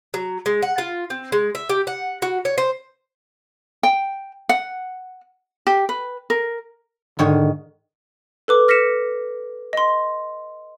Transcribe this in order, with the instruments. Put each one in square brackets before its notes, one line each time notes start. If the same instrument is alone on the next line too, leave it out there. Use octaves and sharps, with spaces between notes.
[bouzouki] F#3
G#3
F#5
F4
C4
G#3
E5
G4
F#5
F#4
C#5
C5
[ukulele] G5
F#5
G4
B4
A#4
[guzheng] G#2 D#3 C#5 [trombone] D3
[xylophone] A4 B4 D6
F6 A#6 B6 C#7 E7
D#5 C6